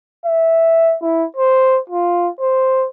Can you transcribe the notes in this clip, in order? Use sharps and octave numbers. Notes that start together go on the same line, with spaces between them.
E5
E4
C5
F4
C5